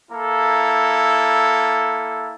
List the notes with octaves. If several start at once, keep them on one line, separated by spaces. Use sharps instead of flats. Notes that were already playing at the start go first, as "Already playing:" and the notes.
A#3 E4 A4